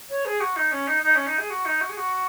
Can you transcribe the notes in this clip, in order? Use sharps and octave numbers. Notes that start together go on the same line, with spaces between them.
C#5
G#4
F#4
D#4
C#4
D#4
D#4
C#4
D#4
G#4
F#4
D#4
F#4
G#4
F#4